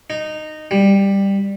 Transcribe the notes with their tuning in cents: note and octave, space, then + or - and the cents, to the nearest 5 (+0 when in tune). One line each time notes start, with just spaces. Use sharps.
D#4 -15
G3 +10